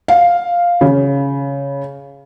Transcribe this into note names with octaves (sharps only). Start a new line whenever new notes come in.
F5
C#3